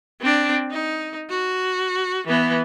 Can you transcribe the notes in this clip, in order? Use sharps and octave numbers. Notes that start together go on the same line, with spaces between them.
C4 D4
D#4
F#4
E3 B3